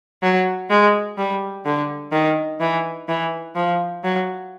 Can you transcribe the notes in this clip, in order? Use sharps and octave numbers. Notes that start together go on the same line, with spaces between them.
F#3
G#3
G3
D3
D#3
E3
E3
F3
F#3